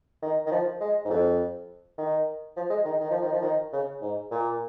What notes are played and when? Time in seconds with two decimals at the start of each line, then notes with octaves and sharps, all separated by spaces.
0.22 D#3
0.46 D#3
0.51 F3
0.80 G#3
1.05 G#2
1.10 F2
1.98 D#3
2.56 F3
2.70 G#3
2.85 D#3
3.00 D#3
3.10 F3
3.21 D#3
3.32 F3
3.42 D#3
3.73 C#3
4.01 G#2
4.31 A#2